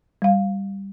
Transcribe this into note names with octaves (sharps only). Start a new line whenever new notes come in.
G3 F5